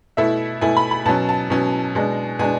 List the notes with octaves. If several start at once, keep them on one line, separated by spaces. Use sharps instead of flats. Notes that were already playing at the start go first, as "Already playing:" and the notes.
B2 A3 E4 E5
B2 A3 E4 G#5
B5
B5
B2 F#3 C#4 A5
A5
B2 F#3 C#4
B2 G#3 D4
B2 G#3 D4 G#5